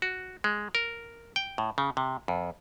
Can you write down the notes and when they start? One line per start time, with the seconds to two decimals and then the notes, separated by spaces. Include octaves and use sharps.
0.02 F#4
0.44 G#3
0.75 A#4
1.36 G5
1.58 A2
1.78 C#3
1.97 C3
2.28 F2